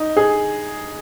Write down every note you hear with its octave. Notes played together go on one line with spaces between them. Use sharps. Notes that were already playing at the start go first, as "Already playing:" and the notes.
Already playing: D#4
G#4